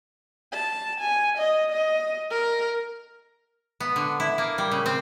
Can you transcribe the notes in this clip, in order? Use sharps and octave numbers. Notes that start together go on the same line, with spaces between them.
A5
G#5
D#5
D#5
A#4
B3
D3
E4
A#3
G3
C#3
C4